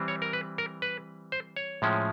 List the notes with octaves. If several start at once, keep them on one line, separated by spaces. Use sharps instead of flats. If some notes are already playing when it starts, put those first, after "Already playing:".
Already playing: E3 G3 C4
C#5
A#4
B4
A#4
B4
C5
C#5
A2 F3 G#3 C#4